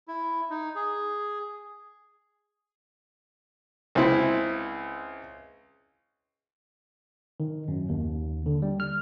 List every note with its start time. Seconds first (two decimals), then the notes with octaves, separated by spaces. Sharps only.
0.08 E4
0.50 D#4
0.76 G#4
3.95 C#2 C4 E4
7.40 D#3
7.68 F#2
7.89 D#2
8.46 D3
8.62 G3
8.80 F6